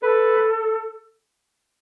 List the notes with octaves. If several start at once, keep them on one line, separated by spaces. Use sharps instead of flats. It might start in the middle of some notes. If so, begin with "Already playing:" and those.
A4 B4